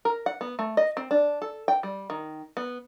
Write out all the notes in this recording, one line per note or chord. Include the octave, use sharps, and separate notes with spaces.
A#4
F#5
B3
A3
D#5
C4
D4
A4
G5
G3
D#3
B3